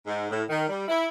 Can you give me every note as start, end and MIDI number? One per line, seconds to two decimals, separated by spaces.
0.06 0.28 44
0.31 0.43 45
0.49 0.65 51
0.69 0.85 55
0.88 1.07 64